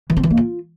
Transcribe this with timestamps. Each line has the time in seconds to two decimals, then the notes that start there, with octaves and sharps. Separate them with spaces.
0.10 E3
0.17 C4
0.23 E3
0.30 A#3
0.37 F4